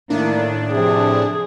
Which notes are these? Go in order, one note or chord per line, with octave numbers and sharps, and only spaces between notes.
A2 D#3 A#3 D4 E4
C3 F3 G#4